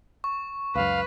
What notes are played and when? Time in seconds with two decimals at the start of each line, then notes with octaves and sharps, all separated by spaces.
0.24 C#6
0.75 C#2 F#2 B4 F5